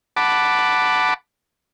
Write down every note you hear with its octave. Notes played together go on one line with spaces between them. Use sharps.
F#5 A5 B5 D6